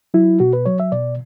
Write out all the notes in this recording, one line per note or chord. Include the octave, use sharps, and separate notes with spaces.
F#3 E4
B2 F#4
B4
F#3 C#5
E5
B2 D5